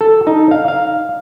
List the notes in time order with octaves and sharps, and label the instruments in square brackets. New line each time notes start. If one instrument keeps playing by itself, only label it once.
[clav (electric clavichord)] A4
D#4
F5
F5